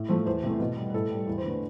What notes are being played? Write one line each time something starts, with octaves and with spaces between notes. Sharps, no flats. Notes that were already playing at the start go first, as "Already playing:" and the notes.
Already playing: A2
F3 A3 C5
E2 C5
C3 E3 A3
B2
G3
B4
A2 A4
G3
E2 B4
C5
D3 A3 B4